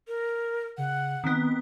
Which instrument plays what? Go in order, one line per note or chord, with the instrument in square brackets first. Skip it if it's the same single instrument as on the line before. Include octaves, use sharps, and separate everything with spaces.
[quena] A#4
[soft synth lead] C#3 [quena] F#5
[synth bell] D#3 B3 [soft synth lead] C4